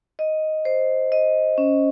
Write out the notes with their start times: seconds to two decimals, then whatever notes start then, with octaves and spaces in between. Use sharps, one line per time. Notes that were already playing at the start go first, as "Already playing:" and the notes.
0.19 D#5
0.65 C5
1.12 D#5
1.58 C#4